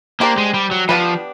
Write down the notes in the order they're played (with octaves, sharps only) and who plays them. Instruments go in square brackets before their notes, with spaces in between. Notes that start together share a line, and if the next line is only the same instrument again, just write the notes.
[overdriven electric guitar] A#3 [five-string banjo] D4 G4 C5
[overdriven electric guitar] G#3
G3
F#3
[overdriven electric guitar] F3 [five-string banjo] B3 D4 G4 B4